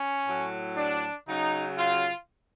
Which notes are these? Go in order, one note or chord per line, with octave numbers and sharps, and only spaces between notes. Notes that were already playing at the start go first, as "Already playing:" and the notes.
Already playing: C#4
A2 F#3
D4
C#3 F#3 D#4
F4